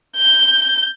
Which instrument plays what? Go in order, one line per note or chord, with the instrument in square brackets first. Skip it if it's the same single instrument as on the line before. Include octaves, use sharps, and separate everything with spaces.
[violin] G6